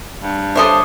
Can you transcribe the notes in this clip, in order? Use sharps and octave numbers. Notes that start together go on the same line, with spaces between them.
G2
A4 C5 C#5 E5 D6 D#6